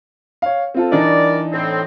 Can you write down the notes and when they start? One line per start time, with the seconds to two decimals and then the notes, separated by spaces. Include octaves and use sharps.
0.42 C#5 F5
0.74 C4 F4 A4
0.92 E3 G3 D4 D#4 A#4 D5
1.53 A2 C4